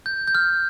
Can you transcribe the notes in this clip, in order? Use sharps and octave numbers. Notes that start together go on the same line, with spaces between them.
G6
G6
F6